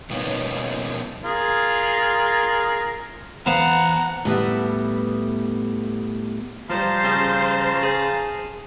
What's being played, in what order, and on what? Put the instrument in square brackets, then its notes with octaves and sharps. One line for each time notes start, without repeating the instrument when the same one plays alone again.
[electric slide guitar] B2 F3 A#3 B3 C#4 D#4
[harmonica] F4 G#4 A#4
[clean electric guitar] E2 C5 F5 [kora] B3 [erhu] F#5 [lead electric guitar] A#5 B5
[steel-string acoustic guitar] A2 G3 B3 E5
[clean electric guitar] F3 G3 [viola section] C5 [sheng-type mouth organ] F5 A5 A#5
[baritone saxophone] C#3
[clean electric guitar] G#4